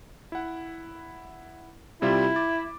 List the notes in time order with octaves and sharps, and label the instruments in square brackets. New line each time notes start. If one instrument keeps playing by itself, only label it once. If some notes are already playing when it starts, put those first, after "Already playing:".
[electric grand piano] E4 F#5
[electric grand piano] C3 G3 F4 [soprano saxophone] E4
[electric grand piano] D6 A6